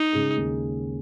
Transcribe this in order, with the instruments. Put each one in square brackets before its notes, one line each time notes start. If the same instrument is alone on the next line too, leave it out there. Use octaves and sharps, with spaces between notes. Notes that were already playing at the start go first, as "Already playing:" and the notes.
Already playing: [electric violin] D#4
[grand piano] C#3 G#3 C#4 G#4
D#2